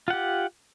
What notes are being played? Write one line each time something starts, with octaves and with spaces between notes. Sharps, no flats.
F4 G4 F#5